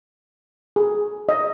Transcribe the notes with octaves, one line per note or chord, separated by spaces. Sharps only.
G#4
D#5